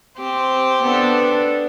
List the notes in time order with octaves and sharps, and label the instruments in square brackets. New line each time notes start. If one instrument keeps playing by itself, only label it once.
[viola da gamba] C4 [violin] G4 C5
[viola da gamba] B3 D4 A4